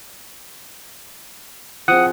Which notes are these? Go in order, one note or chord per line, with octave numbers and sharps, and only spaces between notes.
F3 C4 G#4 F#5 D#6